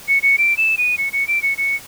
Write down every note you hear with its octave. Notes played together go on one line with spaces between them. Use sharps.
C#7
C#7
D7
E7
D#7
C#7
C#7
D7
C#7
C#7